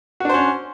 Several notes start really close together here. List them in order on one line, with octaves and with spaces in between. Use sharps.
F#4 D4 C5 C#4